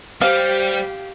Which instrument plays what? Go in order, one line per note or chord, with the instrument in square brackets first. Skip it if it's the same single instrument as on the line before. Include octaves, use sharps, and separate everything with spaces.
[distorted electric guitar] G3 [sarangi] G4 [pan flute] C5 [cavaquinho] F5